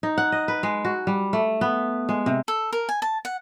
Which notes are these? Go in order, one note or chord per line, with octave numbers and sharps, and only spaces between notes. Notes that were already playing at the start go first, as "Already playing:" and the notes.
D#4
F#5
D#5
B4
G#3
F#4
G3
A3
B3
G#3
C3
A4
A#4
G#5
A5
F#5